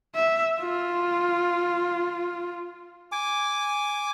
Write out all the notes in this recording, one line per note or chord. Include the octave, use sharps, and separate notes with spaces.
E5
F4
G#5 D6